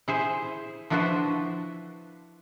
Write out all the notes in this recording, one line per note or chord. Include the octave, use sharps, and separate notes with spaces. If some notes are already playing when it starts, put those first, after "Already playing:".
E4 G#4 C5
F3 D4 E4 F#4 B4 C5